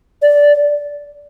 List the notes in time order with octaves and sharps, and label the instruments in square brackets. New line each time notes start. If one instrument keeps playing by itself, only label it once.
[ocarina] D5